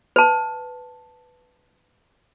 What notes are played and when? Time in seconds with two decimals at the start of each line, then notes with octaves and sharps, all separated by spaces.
0.16 B4 A5